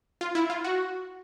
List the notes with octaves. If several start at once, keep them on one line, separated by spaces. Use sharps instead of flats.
F4
E4
F4
F#4